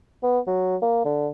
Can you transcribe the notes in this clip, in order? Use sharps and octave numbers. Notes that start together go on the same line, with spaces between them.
B3
F#3
A#3
D3